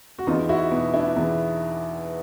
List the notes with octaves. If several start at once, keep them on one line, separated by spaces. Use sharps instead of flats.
F#4
E2 D#4 F4
E4 F#4
B2
D4 E4
E2